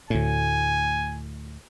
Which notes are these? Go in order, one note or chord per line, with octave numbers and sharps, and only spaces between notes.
D2 A2 G#5